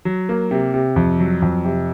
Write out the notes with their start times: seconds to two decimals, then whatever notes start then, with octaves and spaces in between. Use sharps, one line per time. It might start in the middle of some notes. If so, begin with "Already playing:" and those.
0.05 F#3
0.29 A#3
0.51 C3
0.74 C3
0.96 F2
1.20 F#3
1.42 F2
1.65 C3